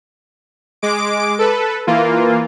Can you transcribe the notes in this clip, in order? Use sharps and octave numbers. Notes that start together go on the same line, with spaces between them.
G#3 D6 D7
A4 B4
E3 A#3 F4